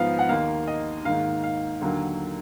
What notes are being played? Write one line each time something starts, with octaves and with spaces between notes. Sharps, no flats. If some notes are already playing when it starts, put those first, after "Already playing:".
Already playing: G#2 F3 B3 F5
F#5
D#2 D#3 A#3 F5
D#5
G#2 D#3 A#3 F5
F5
D#2 D3 F#3 A#3